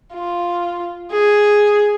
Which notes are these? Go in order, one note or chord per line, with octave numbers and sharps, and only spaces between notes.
F4
G#4